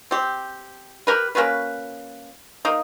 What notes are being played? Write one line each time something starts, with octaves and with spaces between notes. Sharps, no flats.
C4 G4
G4 A#4 B4
A#3 C#4 F#4 B4
A#3 D#4